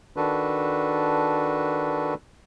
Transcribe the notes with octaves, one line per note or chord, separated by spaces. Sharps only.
D#3 D4 F#4 A4 B4